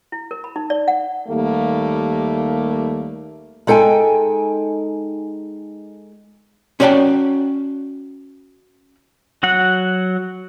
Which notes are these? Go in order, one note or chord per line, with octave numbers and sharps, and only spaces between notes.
E4
A#4
B5
D#4
D5
F#5
D#2 G3 A3 A#3
G#3 D#4 A4 F5 G5 G#5
C#4 F#4 D5 F5 G5 A5
F#3 F#4 F#5